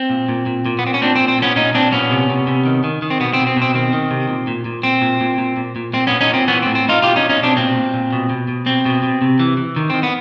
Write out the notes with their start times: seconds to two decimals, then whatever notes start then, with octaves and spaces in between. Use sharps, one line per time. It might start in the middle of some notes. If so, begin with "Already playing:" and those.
Already playing: C4
0.10 A#2
0.29 A#2
0.46 A#2
0.66 A#2
0.79 B3
0.83 A#2 C4
0.94 C#4
1.01 A#2 C4 D4
1.15 C4
1.20 A#2
1.28 C4
1.38 A#2 B3 C#4
1.56 A#2 C#4 D#4
1.74 A#2 C4 D4
1.92 A#2 B3 C#4
2.10 C3
2.30 C3
2.47 C3
2.65 D#3
2.84 D#3
3.02 D#3
3.10 C4
3.20 B2 B3
3.34 C4
3.39 B2
3.47 C4
3.56 B2
3.62 C4
3.74 D#3 C4
3.93 D#3
4.11 C3
4.29 A#2
4.47 A#2
4.65 A#2
4.83 A#2 C4
5.02 A#2
5.21 A#2
5.38 A#2
5.57 A#2
5.76 A#2
5.94 A#2 C4
6.07 A#2 B3 C#4
6.21 C#4 D#4
6.30 A#2 C4
6.48 E3 B3 C#4
6.62 A2 C4
6.75 C4
6.85 A2 D#4 F4
7.02 B2 F4 G4
7.16 C#4 D#4
7.21 B2
7.30 C#4 D#4
7.40 B2 C4 D4
7.57 A#2 C4
7.76 A#2
7.94 A#2
8.13 B2
8.30 B2
8.48 B2
8.66 B2 C4
8.85 B2
9.03 B2
9.22 C3
9.39 E3
9.57 E3
9.76 D#3
9.90 D#3 C4
10.03 B3